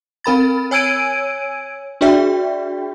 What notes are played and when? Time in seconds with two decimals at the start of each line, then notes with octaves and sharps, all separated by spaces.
0.24 C4 A#4 B5 A6
0.71 C#5 G#5 E6 G#6 D7 D#7
2.01 D4 F#4 G#4 D5 E5 G5